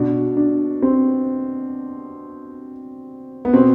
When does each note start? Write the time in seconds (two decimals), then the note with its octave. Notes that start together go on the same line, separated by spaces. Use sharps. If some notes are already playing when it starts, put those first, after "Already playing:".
Already playing: B2 D4
0.37 D4
0.82 C4
3.45 B3
3.53 B2 C4